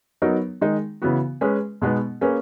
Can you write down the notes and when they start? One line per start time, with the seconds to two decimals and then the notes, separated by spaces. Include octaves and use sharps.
0.22 F#3 B3 D#4 A#4 C#5
0.61 D#3 G#3 D#4
1.02 C#3 E3 B3 F#4
1.41 G#3 C#4 G#4 B4
1.82 B2 G#3 B3 D#4
2.21 A#3 C#4 G#4 B4